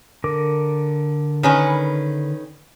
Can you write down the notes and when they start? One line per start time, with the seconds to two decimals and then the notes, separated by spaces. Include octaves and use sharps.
0.24 D3 A#4 D6
1.43 D#3 C#4 B4